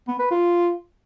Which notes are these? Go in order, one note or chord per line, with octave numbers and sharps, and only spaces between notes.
B3
B4
F4